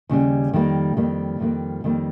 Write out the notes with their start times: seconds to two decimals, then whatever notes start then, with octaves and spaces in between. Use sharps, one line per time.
0.09 D#2 C#3 G3
0.53 F2 D#3 G3 A#3
0.97 F2 D#3 G3 A#3
1.40 F2 D#3 G3 A#3
1.84 F2 D#3 G3 A#3